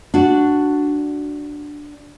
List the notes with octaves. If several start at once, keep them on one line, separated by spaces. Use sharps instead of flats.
D4 F#4